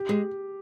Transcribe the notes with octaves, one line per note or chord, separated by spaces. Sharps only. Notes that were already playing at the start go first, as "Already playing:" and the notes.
Already playing: G4
G#3